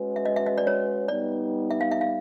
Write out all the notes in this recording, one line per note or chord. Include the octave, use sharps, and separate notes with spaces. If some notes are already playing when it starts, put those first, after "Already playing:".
Already playing: G#3 C#4 F#4 B4
E5
D#5
E5
D#5
D5
C#5
G3 B3 D#4 D5
E5
F5
E5
F5